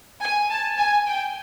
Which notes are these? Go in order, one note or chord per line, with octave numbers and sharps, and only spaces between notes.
G#5
A5
G#5
G5